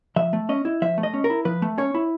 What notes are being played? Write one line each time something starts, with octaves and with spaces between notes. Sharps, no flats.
F3 E5
A3
C#4 D#5
E4
F3 E5
A3
D#5
C#4
A#4
E4
F3 B4
A3
C#4 C#5
E4